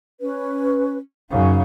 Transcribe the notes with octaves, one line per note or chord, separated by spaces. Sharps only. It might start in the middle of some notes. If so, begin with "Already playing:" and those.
C#4 B4
F#2 C#3 D#4 F5